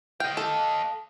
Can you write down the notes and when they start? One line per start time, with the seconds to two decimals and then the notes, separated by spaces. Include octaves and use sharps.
0.20 D#5 F5 G5
0.37 A4